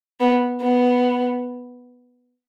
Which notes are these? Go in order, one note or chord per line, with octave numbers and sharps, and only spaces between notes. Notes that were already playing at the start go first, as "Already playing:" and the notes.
B3
B3